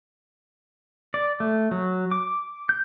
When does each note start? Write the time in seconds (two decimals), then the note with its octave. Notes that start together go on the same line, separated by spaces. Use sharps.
1.14 D5
1.40 A3
1.71 F#3
2.11 D6
2.69 G6